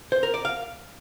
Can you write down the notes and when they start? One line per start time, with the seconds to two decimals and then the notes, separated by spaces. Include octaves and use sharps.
0.12 C5
0.23 A#4
0.34 D5
0.45 F5